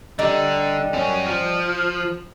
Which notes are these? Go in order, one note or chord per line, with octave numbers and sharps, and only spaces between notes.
D3 G3 D#4
F#2 C#4
F3